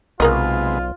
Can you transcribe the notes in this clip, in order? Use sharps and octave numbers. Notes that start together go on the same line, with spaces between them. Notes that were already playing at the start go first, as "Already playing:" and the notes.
B1 C3 G#3 B3 F4 G#4 A#4 D#5